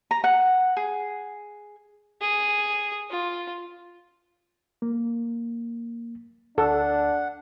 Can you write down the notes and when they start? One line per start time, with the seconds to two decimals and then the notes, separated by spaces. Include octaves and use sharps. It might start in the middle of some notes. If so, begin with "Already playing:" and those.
0.11 A#5
0.24 F#5
0.77 G#4
2.21 G#4
3.10 F4
4.82 A#3
6.58 D2 D4 A4 F#5